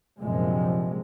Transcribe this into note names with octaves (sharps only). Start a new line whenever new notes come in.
A#1 F#2 C3 F3 G#3